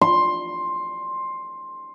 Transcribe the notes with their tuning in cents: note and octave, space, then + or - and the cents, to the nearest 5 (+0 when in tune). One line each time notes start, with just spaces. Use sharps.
C6 +10